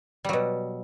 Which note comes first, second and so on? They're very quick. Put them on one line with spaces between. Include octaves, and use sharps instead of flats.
G3 F#3 B2